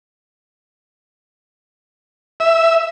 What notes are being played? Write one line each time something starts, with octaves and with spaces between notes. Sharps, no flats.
E5